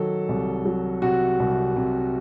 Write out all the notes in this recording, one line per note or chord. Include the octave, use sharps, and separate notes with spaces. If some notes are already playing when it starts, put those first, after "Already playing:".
Already playing: D#3 F#3 A4
C2
F#3
C3 F#4
C2
C3